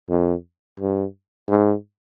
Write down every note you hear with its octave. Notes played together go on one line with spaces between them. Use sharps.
F2
G2
G#2